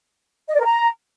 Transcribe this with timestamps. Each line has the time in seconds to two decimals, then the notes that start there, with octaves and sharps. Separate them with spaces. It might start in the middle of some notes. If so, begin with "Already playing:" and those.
0.49 D#5
0.54 D5
0.59 A#4
0.65 A#5